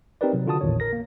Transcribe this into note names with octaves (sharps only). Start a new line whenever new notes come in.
C4 D#4 G4 A#4 B4 D5
C3 F#3
D3 F4 F#4 A5 D#6
A1 E2 A#2 D#3 C#5
A#4 A#6
A#3